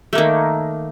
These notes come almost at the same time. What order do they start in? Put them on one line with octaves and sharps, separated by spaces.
A3 A#3 D#3